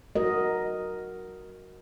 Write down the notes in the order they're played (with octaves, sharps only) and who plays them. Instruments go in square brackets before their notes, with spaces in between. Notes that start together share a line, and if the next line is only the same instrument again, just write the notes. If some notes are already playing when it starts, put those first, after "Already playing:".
[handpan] F#4 A#4 D#5